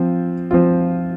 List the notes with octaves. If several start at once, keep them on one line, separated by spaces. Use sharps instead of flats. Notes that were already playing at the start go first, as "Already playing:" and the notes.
Already playing: F3 C4 F4
F3 C4 F4